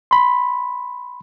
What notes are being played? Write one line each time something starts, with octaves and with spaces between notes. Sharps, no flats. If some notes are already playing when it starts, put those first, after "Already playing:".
B5 C6